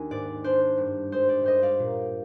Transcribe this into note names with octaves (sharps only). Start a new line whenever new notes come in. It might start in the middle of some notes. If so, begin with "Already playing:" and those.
Already playing: D#2 D4 G#5
G#2 D5
D4 C5
G2
G#3 C5
D5
G2 C5 D#5
D5 F5
A#2